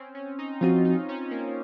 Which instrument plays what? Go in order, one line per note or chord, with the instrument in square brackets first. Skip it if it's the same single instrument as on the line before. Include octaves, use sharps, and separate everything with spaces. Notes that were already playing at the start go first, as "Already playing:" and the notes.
Already playing: [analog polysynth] C4 C#4
C#4
D#4
[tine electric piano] F3 C4 F#4 [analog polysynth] F4
[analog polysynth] D#4
C#4
A#3